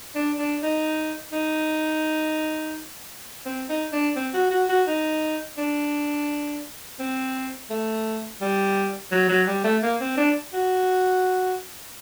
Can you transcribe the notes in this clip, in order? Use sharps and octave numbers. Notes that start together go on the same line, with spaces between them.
D4
D4
D#4
D#4
C4
D#4
D4
C4
F#4
F#4
F#4
D#4
D4
C4
A3
G3
F#3
F#3
G3
A3
A#3
C4
D4
F#4